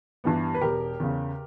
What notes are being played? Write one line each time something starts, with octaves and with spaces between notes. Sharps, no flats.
G2 E3 G3 B3
B4
E1 G4 A#4
E2 C#3